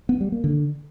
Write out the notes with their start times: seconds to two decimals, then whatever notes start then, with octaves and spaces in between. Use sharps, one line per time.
0.09 B3
0.21 G3
0.32 A#3
0.44 D3